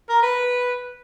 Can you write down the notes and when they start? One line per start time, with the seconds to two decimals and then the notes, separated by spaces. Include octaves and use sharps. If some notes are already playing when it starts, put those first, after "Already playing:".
0.09 A#4
0.22 B4